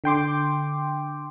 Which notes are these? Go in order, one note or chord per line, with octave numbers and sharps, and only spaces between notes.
D3 G5 C6 D6